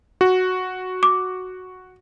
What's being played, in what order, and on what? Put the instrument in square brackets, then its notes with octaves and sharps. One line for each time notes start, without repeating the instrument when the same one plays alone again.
[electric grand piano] F#4
[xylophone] D6